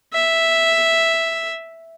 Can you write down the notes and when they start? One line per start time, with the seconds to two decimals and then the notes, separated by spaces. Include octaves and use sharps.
0.13 E5